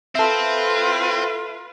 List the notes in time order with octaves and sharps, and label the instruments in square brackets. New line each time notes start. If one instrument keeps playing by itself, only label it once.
[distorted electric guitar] C4 [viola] F4 B4 [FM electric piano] A4 E5